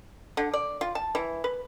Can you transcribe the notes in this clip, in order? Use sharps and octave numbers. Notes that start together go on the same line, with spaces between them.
D3
D5
F4
A5
E3
B4